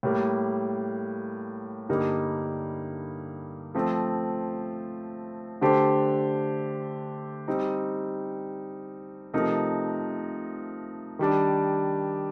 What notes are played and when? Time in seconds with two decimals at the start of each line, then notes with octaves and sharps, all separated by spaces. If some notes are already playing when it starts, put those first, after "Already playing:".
0.03 A2 G3 A#3
1.89 G2 D3 G3 A#3 D#4
3.75 F3 A3 C4
5.61 D3 A3 D4 G4 C5
7.48 G3 C4 D#4
9.34 C3 F3 A3 D#4 A#4
11.19 D#3 G3 D4